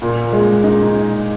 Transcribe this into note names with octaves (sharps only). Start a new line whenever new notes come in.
A#2
G#3
D#4